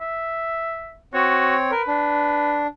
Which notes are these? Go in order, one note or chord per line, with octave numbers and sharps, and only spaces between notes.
E5
C4 F#4 C#5
A#4 B4
D4